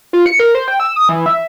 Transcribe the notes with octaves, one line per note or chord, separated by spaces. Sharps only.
F4
C#7
A#4
C5
G5
E6
D#6
E3
E5